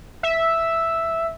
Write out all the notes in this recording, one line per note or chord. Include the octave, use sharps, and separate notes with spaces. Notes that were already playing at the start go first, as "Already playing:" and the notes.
E5